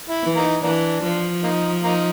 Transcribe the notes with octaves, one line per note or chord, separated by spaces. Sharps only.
E4
E3
A#3 D#4
E3 A#3 D4
F3
A#3 D#4
A#3 D#4